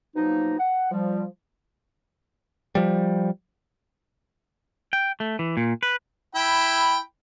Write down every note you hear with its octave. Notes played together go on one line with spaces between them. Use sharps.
B2 F3 F#3 A#3 D#4
F#5
F3 G3
F3 G3
G5
A3
E3
A#2
B4
E4 G5 B5